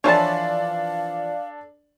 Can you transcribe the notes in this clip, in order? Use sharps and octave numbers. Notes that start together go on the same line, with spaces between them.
E3 F3 D4 A4 C#5 D5 F5 A5